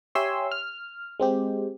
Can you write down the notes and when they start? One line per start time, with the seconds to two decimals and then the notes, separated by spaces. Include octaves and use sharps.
0.15 G4 C#5 E5 G#5 C6 E6
0.52 F6
1.20 G#3 C4 G4